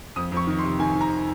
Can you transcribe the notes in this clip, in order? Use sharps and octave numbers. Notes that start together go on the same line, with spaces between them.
F2 D#6
F2 C#6
D#3
C6
C3
D#3 G#5
D#3
A#5